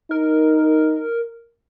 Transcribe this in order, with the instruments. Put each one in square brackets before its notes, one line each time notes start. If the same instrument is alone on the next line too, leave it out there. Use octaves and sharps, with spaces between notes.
[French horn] D#4 [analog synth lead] A#4